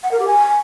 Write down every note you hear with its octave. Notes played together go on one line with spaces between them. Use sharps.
F#5
A#4
G4
G#5